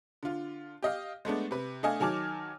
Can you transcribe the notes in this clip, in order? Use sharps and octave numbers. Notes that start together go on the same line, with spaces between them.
D3 F4
G4 D#5 F5
G#3 A3 B3 D4
C3 B4
A3 D4 D#5 F5 G#5
D#3 F#3 G#5 A5 D6 F6